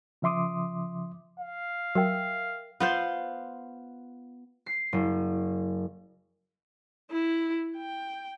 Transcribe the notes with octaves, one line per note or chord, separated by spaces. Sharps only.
C#3 F3 E5 C6 D6 D#6
F5
F#3 A#4 E5 G5
B3 F4 C5
C7
F#1
E4
G5